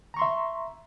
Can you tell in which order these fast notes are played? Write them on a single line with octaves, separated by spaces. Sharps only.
A#5 C#6 C6 E5